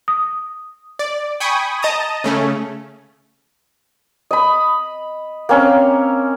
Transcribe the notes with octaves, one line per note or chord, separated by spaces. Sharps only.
D#6
D5
G5 G#5 B5 C#6 D#6
D#5 A5 A#5 D#6
C#3 A3 C#4
D#5 B5
A#3 C4 C#4